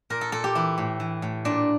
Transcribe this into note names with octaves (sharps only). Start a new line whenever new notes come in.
A#2 A#4
A4
A#2 A4
G4
E3 E4
A2
E3
A2
A#2 D4